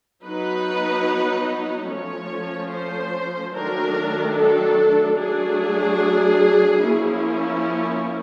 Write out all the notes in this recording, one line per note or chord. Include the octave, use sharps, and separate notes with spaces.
F#3 B3 D#4 B4
F3 A3 C#4 C#5
C5
D#3 F#3 A3 D4 A#4
A4
F#3 A3 D4 G#4
F3 A#3 C#4 E4